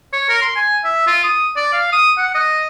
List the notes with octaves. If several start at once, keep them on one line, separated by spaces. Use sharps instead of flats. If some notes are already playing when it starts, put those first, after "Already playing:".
C#5
A#4
C6
G#5
E5
F4
D#6
D5
F5
D#6
F#5
D#5